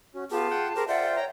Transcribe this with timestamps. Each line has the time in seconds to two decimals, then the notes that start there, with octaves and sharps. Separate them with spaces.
0.14 C#4 F#4
0.31 B3 F4 G4 G#4 A5
0.51 F#5 G5
0.76 G4 G#4 A#4 C5
0.88 F4 C5 D5 E5 F#5 G5
1.16 C#5 G5 A#5